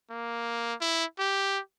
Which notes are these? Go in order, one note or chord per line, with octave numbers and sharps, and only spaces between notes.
A#3
E4
G4